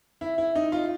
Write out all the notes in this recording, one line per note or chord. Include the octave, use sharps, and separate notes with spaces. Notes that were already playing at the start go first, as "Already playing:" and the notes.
E4
E4
D#4
F4